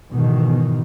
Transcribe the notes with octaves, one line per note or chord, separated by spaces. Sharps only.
G#2 B2 D#3 E3